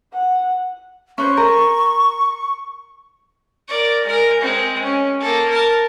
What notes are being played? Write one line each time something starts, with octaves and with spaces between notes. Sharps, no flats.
F#5
C#4 B4 C5 C#6
A#4
A#4 D5
G#3 A#4
G#3 C4
C#4
A#3 A4
A#4 A5